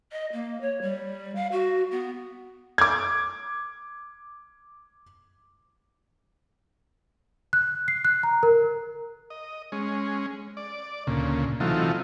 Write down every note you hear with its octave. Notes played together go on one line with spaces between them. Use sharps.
D#5
A#3
C#5
G3
F5
F#4
B3
D6 G#6
F#6
C7
F#6
A#5
A#4
D#5
G#3 C#4
D5
D2 A#2 C#3
C3 E3 F#3 A3 D#4 F4